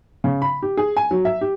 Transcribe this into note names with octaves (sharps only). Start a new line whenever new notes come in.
C#3
B5
G4
G#4
G#5
F#3
E5
G4